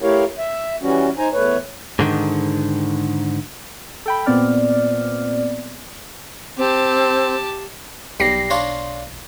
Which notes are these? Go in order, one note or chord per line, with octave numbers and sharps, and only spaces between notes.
A3 E4 G4 A#4 C#5 F5
E5
E3 G3 C#4 F#4
D#4 C5 G#5 A#5
E2 A3 B4 C#5
G#2 D3 D#3
A4 G5 B5
A#2 B3 C4 D5 F6
C4 G4 A5
B1 G3 A#6 C7
D4 F4 C#5